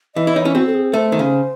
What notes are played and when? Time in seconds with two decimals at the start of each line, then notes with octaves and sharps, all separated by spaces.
0.15 E3 D#5
0.27 E4
0.35 D#4 C#5
0.45 C#4
0.55 C4 F#4
0.66 A4
0.74 G#4
0.93 A3 C5
1.12 D#3
1.19 C#3